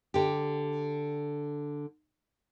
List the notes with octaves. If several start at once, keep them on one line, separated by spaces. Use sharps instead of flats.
D3 G4